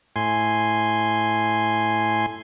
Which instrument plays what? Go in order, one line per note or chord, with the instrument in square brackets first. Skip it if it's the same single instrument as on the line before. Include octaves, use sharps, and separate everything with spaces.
[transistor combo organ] A2 G#5 C6